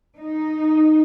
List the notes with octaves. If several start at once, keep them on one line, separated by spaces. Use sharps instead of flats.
D#4